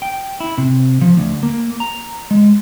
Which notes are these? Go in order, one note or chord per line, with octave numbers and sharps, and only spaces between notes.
G5
E4
C3
F3
D2
A#3
A#5
G#3